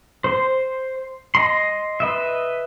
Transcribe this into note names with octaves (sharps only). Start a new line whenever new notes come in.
C5 C6
D#5 C6
B4 D#5 E5